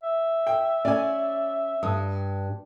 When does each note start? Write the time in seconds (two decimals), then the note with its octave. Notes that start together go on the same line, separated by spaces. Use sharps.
0.03 E5
0.47 G5
0.85 C#4 D5 G#5
1.83 G2 D#6